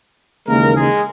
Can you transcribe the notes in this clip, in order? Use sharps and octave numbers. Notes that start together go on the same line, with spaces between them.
D#2 C#3 E3 G#3 A#3 A#4
G#3 G#4